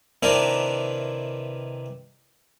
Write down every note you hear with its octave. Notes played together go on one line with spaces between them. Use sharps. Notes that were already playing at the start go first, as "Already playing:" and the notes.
C3 D#3 E3 D4 E4 A#4